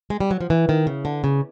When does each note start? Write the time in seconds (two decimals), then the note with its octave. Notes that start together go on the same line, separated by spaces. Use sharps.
0.10 G#3
0.20 G3
0.31 F#3
0.41 F3
0.50 E3
0.69 D#3
0.87 C#3
1.05 D3
1.24 C#3